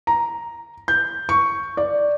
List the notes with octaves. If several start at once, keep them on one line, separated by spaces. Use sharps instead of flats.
A#5
G6
C#6
D5